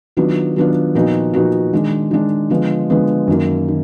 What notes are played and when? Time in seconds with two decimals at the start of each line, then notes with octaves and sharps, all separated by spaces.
0.17 D#3 F#3 B3 D4 F4
0.56 D#3 F#3 B3 D4 F4
0.95 A#2 F3 B3 D#4 F#4
1.34 A#2 F3 B3 D#4 F#4
1.73 D#3 G#3 D4
2.11 D#3 G#3 D4
2.50 D3 F3 G#3 B3
2.90 D3 F3 G#3 B3
3.27 F#2 D#3 A#3
3.68 D#3